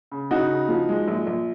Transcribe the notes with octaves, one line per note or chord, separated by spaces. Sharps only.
C#3
C#3 D#4 F#4
C#3
F3
G#3
A#1
A#1